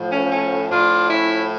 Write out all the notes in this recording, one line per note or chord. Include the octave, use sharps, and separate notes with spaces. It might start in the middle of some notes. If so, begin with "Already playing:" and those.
Already playing: A2 F3
A3 C#4
A3 C#4
A2 F3 D4 F4
C#4 E4